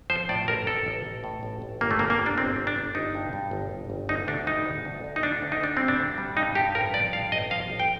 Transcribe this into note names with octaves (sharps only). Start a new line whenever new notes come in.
F3 C5
A2 D5
A1 A#4
A1 A4
A1
A1
A2
A1
A1
G1 A#3
A3
D3 A#3
A#3
G1
D4
G1 C4
G1
D4
G1
G1 D#4
G2
G2
G1
G1
G1
D2 D#4
D2 D4
G3 D#4
D2
D2
D2
D#4
D2 D4
D2
D#4
D2 D4
G3 C4
D4
D2
G3
G2 D#4
G2 G4
A1 A#4
F3 D5
G2 F5
A1 D#5
F3 F5
A1
G5